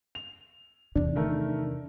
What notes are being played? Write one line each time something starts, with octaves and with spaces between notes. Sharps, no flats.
F7
E2 C3 D4
D#3 A3 A#4